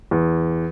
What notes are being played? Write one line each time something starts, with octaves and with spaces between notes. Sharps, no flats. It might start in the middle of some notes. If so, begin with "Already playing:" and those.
E2